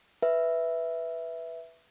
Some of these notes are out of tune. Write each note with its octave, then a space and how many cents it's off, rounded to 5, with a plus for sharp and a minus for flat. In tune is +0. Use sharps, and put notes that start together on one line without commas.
B4 +0 E5 +0